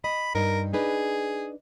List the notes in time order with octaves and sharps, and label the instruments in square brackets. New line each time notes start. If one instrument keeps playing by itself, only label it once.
[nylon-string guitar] D#5 [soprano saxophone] B5
[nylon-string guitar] G2 D#4 [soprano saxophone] A#4
[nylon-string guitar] D4 D#4 B4 [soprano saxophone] G#4